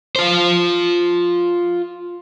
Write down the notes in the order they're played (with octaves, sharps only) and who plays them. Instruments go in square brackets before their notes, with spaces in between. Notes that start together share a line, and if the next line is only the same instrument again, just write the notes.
[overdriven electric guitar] F4 C5